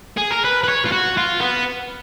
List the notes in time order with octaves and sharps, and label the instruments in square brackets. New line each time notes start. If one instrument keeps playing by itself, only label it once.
[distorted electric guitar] G#4
A#4
B4
B4
C#5
F4
F#4
F4
B3